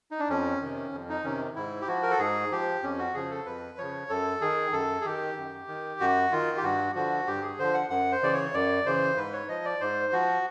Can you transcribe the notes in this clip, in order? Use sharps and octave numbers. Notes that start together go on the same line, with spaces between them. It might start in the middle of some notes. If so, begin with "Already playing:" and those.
D#4
D4
F2 C#4
C3 D#3
F2
D#4
C3 D#3 C#4
G#2 E4
G4
F3 F#4
A#4
A4
G#2 G#4
F3 G4
F2 C#4
F#4
C#3 F3 G#4
A4
F2 B4
C#3 F3 C#5
F#2 A4
D#3 G#4
F#2 A4
G#4
D#3 G4
F#2
D#3
F#2 F#4
D#3 F4
G4
G2 F#4
D3 F3 F#4
G2 G4
G#4
D3 F3 C5
F#5
F#2 F#5
C5
C#3 E3 D5
C#5
F#2 D5
C#3 E3 C5
G#2 B4
C#5
F3 D#5
D5
G#2 C5
F3 F#4